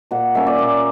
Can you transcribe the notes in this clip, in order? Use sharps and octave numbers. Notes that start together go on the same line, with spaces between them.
A#2 F#5
G3 A#3 C#4 E5
D5
A#2